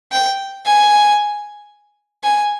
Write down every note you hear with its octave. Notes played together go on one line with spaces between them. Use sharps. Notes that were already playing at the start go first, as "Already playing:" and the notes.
G5
G#5
G#5